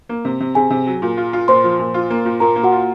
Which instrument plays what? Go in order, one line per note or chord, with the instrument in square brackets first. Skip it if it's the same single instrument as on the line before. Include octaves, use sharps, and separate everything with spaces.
[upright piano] A#3
C3
C3
[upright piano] C3 [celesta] G#4 G#5
[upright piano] C3
F#3
A#2
F4
F4
[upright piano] A#2 [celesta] C5 C6
[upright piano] F3
A#2
F4
A#3
A#2
[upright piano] A#2 [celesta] A#4 A#5
[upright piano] A#3
[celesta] F#4 F#5
[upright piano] F4